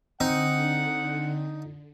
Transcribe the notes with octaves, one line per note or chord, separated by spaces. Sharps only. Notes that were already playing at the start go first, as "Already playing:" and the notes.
D3 C4 D#4 F#5